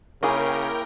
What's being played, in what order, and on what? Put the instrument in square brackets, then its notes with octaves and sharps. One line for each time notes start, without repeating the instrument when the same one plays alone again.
[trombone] C#3 [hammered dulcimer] A#3 E4 [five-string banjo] C#4 G#4 [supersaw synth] A#4 G5